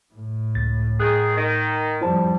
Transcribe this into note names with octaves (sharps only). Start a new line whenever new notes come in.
A2
C#2 A6
D#3 G#4 F#6
D#3 A#6
F2 G3 E4 C5 A5